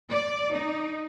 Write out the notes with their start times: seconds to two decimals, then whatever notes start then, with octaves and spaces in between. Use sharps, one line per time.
0.11 D5
0.54 D#4